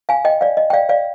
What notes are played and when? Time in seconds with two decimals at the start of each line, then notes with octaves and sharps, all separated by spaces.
0.09 F5 G#5
0.25 D#5 G5
0.41 D5 F5
0.57 D#5
0.70 G5
0.73 D5 F5
0.89 D5 F5